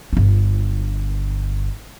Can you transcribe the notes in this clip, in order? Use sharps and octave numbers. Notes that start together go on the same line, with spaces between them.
G1 F4